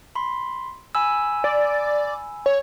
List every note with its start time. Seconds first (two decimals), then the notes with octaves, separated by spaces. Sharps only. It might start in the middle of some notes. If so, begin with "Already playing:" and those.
0.15 B5 C6
0.95 G#5 B5 E6
1.44 D5
2.46 C#5